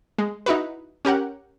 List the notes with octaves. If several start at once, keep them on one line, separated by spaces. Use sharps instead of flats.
G#3
D#4 E4 F#4 B4
C#4 G4 A#4 F#5